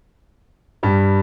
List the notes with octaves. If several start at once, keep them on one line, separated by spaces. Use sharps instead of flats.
G2 G3